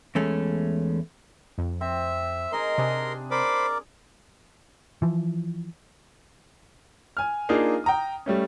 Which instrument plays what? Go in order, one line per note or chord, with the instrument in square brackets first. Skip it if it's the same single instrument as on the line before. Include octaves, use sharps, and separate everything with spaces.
[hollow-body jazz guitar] E2 G#3 A3 C#4
[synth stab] F2
[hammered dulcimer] C4 [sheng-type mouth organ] E5
[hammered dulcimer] D#4 G#4 [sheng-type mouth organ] A#4 C6
[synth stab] C3 [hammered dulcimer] D4 G#4
[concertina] A#4 D5 [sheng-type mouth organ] C5 B5 D6
[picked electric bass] E3 F3
[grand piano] G#5 F6
A#3 D4 D#4 F4 G#4
G5 A#5 D#6
G3 A3 C#4